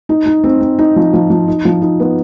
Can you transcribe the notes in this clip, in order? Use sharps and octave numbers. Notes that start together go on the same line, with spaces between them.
D#4
D#4
C4
C4
D#4
F3
F3
F3
D#4
F3
D#4
B3